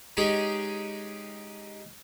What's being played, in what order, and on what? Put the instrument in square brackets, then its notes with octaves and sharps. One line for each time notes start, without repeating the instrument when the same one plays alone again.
[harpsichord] G#3 C#4 D#4 G4 G#4